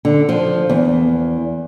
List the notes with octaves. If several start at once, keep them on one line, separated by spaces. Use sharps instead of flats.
D3
F3
E2